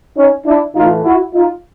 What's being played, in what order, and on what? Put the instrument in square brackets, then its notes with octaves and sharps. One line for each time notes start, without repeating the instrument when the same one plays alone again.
[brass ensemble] C#4 D#4
D4 E4
A2 E3 A3 D#4 F4
E4 F#4
D#4 F4